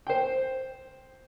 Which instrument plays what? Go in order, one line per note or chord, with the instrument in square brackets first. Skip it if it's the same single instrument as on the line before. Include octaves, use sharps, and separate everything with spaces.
[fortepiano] C5 G5